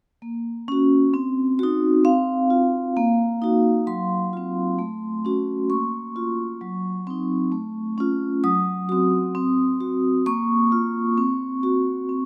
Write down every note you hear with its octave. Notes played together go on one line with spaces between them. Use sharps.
A#3
C#4 F#4
C4
D#4 F#4
C4 F5
F4
A#3
D#4 F#4
F#3 C6
C4 F4
A3
C#4 F#4
A#3 C#6
F4
F#3
C4 D#4
A3
C#4 F4
F#3 D#6
C4 F#4
C4
F#4
A#3 C#6
F4
C4
F#4
C4